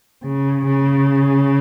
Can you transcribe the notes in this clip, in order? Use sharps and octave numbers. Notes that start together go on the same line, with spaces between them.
C#3
C#3